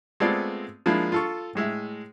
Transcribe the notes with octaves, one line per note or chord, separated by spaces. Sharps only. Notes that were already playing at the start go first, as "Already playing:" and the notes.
G#3 A3 B3 C4 F4 D5
F3 G#3 A#3 D4 E4
F4 A4 C#6
A2 G#3 E5